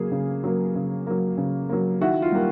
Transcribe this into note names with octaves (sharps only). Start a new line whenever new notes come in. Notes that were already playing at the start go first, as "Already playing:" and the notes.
Already playing: C#3 F#3 A#3 G#4
C#3
F#3 A#3
C#3
F#3 A#3
C#3
F#3 A#3
D#3 E4 F#4
F4
G3 A#3